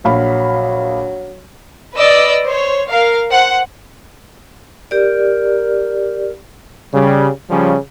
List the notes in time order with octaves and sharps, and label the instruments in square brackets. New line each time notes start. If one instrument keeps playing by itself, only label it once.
[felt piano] A#1 F5 B5 [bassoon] F#3
[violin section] B4 D5 D#5 E6
C5 C#5
A#4 F5
C5 F#5
[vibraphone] G4 D5 [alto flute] A#4
[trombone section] C#3 G3
C#3 F3 G3 C#4